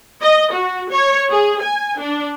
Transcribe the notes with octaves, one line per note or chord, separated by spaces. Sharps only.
D#5
F#4
C#5
G#4
G#5
D4